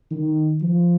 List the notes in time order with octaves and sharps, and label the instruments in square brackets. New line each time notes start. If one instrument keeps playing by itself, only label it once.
[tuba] D#3
F3